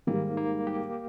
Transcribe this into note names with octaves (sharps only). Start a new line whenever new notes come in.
G#2 D#3 G3 A#3
A#3
G4